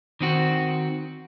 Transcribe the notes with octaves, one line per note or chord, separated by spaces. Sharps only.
D#3 C4 F#4